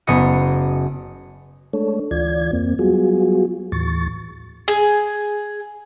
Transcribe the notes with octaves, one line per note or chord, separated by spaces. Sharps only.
F#1 B3 D#5 D#6 C#7
G#3 A3 D4 A4 C#5
D2 E3 F4 D5 G#6
F2 A#3 C4
F#3 G3 B3 F4 F#4 G#4
D#2 A2 E3 C#6 A6
G#4